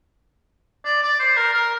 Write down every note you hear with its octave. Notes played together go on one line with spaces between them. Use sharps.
D5
D5
C5
A#4
A#4